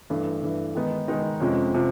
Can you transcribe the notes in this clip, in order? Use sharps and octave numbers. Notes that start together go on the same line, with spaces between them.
G2 E3 A3
G2 E3 A3
D#3 G#3 B3 D#4
D#3 G#3 B3 D#4
F2 C3 F3 G#3 C#4
C3 F3